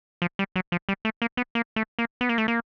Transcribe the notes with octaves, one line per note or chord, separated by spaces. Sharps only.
F3
G3
F#3
F3
G3
A3
A#3
B3
A#3
A3
A#3
B3
A#3
A3
A#3